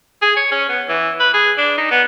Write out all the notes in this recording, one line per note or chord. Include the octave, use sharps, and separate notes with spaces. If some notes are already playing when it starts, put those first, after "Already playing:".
G#4
C#5
C#4
B3
E3
B4
G#4
D4
D#4
B3